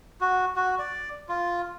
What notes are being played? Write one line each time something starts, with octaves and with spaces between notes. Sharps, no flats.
F#4
F#4
D5
F4